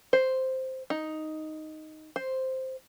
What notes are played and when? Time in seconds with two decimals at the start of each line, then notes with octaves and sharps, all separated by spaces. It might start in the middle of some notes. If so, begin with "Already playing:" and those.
0.13 C5
0.90 D#4
2.16 C5